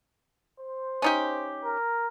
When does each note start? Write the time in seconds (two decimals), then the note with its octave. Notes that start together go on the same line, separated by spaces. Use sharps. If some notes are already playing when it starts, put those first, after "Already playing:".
0.60 C5
1.02 C#4 D#4 G4
1.64 A#4